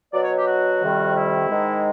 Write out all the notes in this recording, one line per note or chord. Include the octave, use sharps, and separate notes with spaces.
B2 F#3 D5
C#5
G4
F#4
F2 C3 D#3 G3
E4
G#2 D#3 G#3